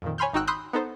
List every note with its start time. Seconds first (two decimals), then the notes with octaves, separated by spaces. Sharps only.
0.02 F2 A#2 D#3
0.18 C#5 G#5 B5 C6 F6 G6
0.33 G#1 D#4 F#4 G5 E6 F#6
0.47 B5 C6 D#6 E6 F#6 G6
0.73 B3 D#4 A4 C5